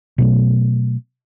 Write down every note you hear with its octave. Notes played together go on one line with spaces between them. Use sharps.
B2 F#3 A3